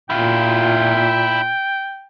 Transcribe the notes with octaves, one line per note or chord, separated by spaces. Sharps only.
A#2 E4 F4 G5